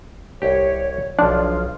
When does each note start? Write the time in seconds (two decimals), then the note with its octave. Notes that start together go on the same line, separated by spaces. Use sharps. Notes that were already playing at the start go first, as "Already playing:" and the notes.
0.42 C2 G4 C#5
1.19 B1 F3 D4 F4